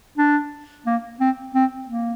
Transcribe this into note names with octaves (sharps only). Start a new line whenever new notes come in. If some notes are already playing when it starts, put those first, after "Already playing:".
D4
A#3
C4
C4
A#3